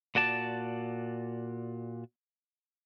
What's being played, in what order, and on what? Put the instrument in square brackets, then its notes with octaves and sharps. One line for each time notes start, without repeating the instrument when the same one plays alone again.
[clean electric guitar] A#2 F#4 D5 A5